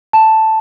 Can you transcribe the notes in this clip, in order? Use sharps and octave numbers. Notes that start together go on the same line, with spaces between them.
A5